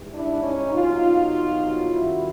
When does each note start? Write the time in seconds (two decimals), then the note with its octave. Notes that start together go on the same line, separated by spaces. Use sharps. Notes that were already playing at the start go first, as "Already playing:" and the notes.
Already playing: G#2 E3 G3
0.14 D4 E4
0.43 C#4 D#4
0.72 C2 B2 F#3 D#4 F4
1.91 F#2 D#3 G3 E4 F#4